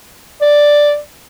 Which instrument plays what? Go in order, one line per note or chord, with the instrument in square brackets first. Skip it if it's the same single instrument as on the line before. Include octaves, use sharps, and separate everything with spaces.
[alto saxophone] D5